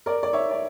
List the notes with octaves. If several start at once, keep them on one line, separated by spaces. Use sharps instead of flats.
A#4 D5
D5
C#5 E5
D5